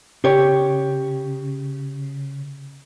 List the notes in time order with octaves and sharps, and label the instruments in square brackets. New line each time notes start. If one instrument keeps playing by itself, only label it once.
[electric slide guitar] C#3 [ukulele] G4 C#5